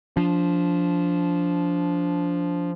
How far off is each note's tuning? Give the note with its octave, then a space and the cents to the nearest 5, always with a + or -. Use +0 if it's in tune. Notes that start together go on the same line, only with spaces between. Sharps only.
F3 +0 D4 -25